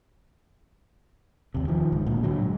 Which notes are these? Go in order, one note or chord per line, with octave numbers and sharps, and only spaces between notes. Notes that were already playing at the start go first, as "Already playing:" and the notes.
D#2 C3
D#3 F3
C#2 G#2
D2 A#2
D3 F#3
G#2